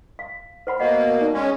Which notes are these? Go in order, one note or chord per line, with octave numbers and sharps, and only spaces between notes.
F5
C5 F#5 B5
B2 A#3 D#5 F#5
D#4 D5
G#3 C#4